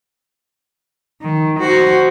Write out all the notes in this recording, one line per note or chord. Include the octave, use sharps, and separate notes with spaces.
D#3
F#4 C5